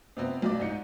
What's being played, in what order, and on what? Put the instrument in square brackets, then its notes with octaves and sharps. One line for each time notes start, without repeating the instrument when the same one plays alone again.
[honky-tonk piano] C3 B3 C4
B1 D5
G#2 D#4 C#7